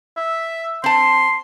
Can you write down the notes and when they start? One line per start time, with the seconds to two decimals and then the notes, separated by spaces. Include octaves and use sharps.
0.17 E5
0.84 C4 A5 C6